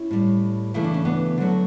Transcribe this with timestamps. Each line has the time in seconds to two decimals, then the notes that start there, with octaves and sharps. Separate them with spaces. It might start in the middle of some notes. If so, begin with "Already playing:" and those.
Already playing: C#4 E4
0.11 A2 G3
0.74 C#3 E3 A3 E4
0.84 D4
0.94 C#4
1.05 B3 D4
1.38 D3 F#3 A3